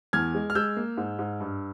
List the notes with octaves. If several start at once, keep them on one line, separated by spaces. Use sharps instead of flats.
E2 F6 G#6
G#3
F6
G#3 E6 G6
A#3
G#2
G#2
G2